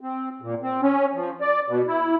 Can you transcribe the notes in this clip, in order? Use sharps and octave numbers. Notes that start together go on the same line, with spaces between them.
C4
A#2
C4
C#4
F3
D5
B2
E4